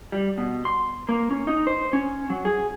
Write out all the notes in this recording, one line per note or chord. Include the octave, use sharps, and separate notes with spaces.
G3
B2
C6
A#3
C#4
D#4
C5
C#4
F#3
G#4